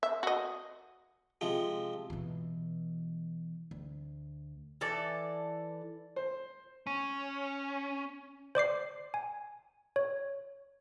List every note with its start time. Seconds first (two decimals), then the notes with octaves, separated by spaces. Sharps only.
0.03 E5
0.23 F#4 D#5
1.41 C3 F3 G#3
2.10 B2 E3
3.71 D2
4.81 E3 A4 D5
6.16 C5
6.87 C#4
8.55 C5 D5 D6 C7
9.14 G#5
9.96 C#5